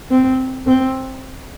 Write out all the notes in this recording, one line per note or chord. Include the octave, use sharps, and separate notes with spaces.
C4
C4